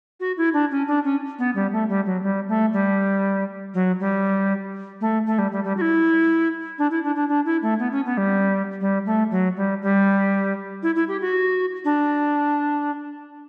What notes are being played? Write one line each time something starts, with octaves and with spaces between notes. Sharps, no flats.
F#4
E4
D4
C#4
D4
C#4
B3
G3
A3
G3
F#3
G3
A3
G3
F#3
G3
A3
A3
G3
G3
G3
F#4
E4
D4
E4
D4
D4
D4
E4
A3
B3
C#4
B3
G3
G3
A3
F#3
G3
G3
E4
E4
G4
F#4
D4